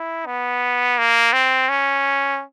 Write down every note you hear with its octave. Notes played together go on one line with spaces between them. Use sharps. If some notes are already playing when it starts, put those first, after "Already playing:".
Already playing: E4
B3
A#3
C4
C#4